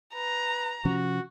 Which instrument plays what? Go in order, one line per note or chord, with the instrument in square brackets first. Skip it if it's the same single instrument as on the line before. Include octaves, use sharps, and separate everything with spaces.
[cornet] B4 [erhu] A#5
[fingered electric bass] C3 F3 C#4 [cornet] F#4